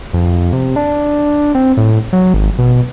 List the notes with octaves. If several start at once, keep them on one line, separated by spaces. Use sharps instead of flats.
F2
C3
D4
C4
A2
F#3
G#1
B2